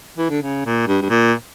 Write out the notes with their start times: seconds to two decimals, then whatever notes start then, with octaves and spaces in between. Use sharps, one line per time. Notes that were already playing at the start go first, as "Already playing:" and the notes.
0.18 E3
0.30 D3
0.42 C#3
0.66 A#2
0.88 G2
1.02 G2
1.10 A#2